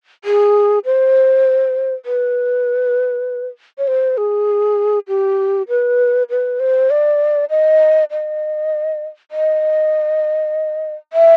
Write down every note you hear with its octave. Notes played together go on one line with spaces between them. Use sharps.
G#4
C5
B4
C#5
C5
G#4
G4
B4
B4
C5
D5
D#5
D#5
D#5
E5